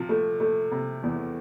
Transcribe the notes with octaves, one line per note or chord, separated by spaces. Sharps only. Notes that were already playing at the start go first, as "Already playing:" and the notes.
Already playing: C3 F3
A3
A3
C3
E2